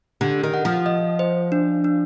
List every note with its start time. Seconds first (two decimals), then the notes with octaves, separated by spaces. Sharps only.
0.21 D3 G4
0.43 D#3
0.54 F#5
0.65 F3
0.86 D#5
1.19 C5
1.52 D4
1.84 D4